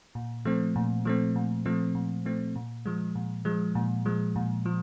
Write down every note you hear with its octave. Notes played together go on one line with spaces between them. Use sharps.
A#2
F3 A3 C4
A#2
F3 A3 C4
A#2
F3 A3 C4
A#2
F3 A3 C4
A#2
F3 G#3
A#2
F3 G#3
A#2
F3 G#3
A#2
F3